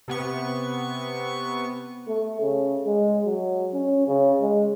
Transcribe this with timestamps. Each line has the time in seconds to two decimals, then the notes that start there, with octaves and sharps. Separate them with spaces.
0.08 C3 B3 C#6
2.08 A3
2.41 C#3
2.87 G#3
3.26 F#3
3.73 C#4
4.07 C#3
4.41 G#3